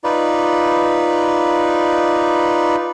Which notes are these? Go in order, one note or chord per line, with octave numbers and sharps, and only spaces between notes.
D#4 F4 B4 D5